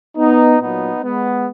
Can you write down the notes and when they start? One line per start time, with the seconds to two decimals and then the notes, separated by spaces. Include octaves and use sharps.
0.17 B3 D#4
0.59 A#2 F#3 B3 D#4
1.02 G#3 B3